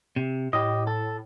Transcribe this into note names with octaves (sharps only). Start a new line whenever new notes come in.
C3
A2 G4 D#5
A4